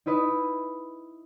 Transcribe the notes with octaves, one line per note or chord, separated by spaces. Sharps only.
D#4 E4 B4 D#5